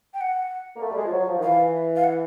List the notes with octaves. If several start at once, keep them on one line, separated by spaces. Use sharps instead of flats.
G5
F#5
A#3
A3
G3
G#3
F3
F#3
F3
D#3
E3 F5
F5
F#5